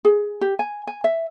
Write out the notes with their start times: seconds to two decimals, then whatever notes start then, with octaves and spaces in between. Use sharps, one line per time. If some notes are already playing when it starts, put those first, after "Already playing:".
0.05 G#4
0.41 G4
0.59 G#5
0.87 G#5
1.04 E5